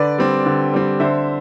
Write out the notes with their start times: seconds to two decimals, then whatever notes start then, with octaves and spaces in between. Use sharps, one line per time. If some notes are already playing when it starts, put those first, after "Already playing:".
Already playing: D3 B4 D5
0.18 G3 C4
0.46 D3
0.73 G3 C4
1.00 D3 C5 E5